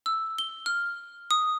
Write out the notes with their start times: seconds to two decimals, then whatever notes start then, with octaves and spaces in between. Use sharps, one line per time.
0.06 E6
0.38 G7
0.66 F6
1.31 D#6